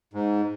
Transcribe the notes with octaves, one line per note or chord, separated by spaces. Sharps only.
G#2